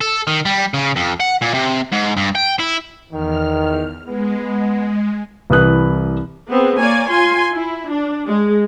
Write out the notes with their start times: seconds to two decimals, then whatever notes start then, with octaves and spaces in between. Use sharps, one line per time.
0.01 A4
0.27 D#3
0.45 G3
0.74 C#3
0.96 F2
1.20 F#5
1.42 A#2
1.54 C3
1.92 G#2
2.17 G2
2.36 G5
2.60 E4
3.12 E2 D#3 F6
4.06 G#3 B3
5.50 C2 E3 B4 D#6 F#6
6.49 B3 C4 G#4
6.78 A#3 C#5 D5 G#5
7.11 F4 G#5 C6
7.53 E4
7.91 D4
8.27 G#3